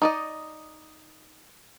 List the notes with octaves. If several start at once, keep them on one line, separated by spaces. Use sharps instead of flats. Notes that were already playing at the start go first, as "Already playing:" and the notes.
D#4 D5 D#5